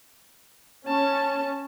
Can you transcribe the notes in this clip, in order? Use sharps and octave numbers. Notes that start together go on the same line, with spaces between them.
C#4 A5